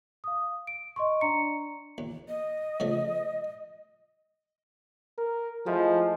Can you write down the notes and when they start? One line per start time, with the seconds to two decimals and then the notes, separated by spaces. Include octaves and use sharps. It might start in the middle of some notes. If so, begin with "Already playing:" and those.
0.24 F5 D#6
0.67 D7
0.96 D#5 C6 C#6
1.21 D4 D5 A#5 C#7
1.98 D#2
2.28 D#5
2.80 C#3 F3 A3
5.18 A#4
5.66 F3 G#3 A3 E4